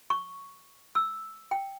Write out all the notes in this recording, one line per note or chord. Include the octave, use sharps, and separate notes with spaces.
C#6
E6
G5